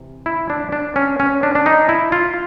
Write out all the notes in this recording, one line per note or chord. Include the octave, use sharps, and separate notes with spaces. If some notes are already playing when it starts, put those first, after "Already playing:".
Already playing: C3 E3
E4
D4
D4
C#4
C#4
D4
D4
D#4
E4
F4